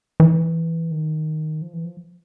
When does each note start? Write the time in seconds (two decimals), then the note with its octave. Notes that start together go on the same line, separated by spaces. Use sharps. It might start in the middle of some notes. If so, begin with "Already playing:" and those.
0.20 E3
0.91 D#3
1.62 F3
1.73 E3
1.85 F3